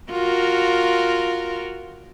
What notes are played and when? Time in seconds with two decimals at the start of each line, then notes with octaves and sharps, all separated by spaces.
0.10 F4 F#4 A#4